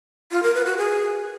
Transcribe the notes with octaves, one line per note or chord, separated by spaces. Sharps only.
F4
A#4
B4
F#4
G#4